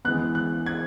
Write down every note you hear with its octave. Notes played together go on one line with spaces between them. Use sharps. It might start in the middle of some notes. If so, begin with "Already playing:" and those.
E3 G#3 B3 F#6
F#6
G#6